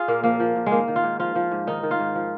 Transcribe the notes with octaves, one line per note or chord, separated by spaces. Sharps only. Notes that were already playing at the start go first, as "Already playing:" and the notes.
Already playing: F4 G#4
A#2 A#3
F3 A#3
F3
A#2
G#3
D#3 A#3
D#3
F4
G#2
F3 F4
F3
G#2
D#3 D#4
D#3
F4
G#2
F3